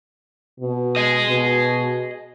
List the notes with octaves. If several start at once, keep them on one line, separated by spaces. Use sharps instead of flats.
B2
G#4 D#5
B2